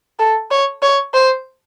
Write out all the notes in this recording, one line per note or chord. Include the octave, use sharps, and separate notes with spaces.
A4
C#5
C#5
C5